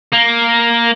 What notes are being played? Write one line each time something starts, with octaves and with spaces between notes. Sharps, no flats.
A#3